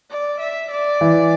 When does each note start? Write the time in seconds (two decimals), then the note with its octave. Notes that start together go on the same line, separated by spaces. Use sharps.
0.10 D5
0.40 E5
0.71 D5
1.01 E3